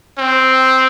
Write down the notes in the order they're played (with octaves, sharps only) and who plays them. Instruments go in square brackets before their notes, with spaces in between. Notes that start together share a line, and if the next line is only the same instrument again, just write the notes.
[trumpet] C4